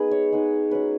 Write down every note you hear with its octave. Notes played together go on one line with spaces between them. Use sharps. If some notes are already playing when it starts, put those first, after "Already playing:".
Already playing: G#3 B3 D#4 G#4 B4
C#5
G#3 B3 D#4
F#3 C#4 B4